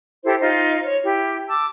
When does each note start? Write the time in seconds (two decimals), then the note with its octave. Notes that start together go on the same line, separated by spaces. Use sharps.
0.24 E4 G4 A4 C5
0.40 D#4 F4 C5
0.84 C#5
1.03 E4 G4
1.48 A5 D6 E6